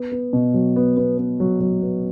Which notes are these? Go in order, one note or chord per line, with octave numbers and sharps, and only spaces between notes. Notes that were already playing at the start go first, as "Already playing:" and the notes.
Already playing: B3
B3
B2
F#3
B3
B3
B3
F#3
F#3
B3